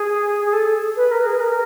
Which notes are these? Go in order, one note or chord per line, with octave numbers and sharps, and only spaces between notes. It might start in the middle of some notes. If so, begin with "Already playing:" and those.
Already playing: G#4
G#4
A4
B4
A#4
G#4
B4
A#4